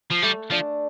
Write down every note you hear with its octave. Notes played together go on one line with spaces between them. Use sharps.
F3
G3 A3
F3 D4